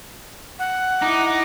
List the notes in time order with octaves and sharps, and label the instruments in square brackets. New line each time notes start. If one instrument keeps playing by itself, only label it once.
[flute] F#5
[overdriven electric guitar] D#4 [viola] E4 D6